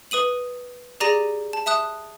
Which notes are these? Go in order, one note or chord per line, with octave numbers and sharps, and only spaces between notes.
B4 D#6 D#7 F#7
G4 G#4 D5 A#5 A#6 D#7
A5
E5 A5 D#6 F#6